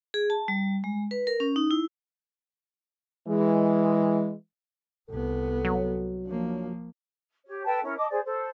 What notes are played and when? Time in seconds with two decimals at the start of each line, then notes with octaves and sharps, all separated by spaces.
0.14 G#4
0.30 A5
0.48 G3
0.84 G#3
1.11 B4
1.27 A#4
1.40 C#4
1.56 D#4
1.71 E4
3.28 E3 G#3
5.10 C2 B3 A4
5.65 F#3
6.26 F3 A#3 D4 F4 C#5
7.45 G4 C#5
7.65 A4 B4 G5 A5
7.84 C#4 E4 A#4
7.97 D#5 A5 D6 D#6
8.10 G#4 C5 D5
8.24 A4 C5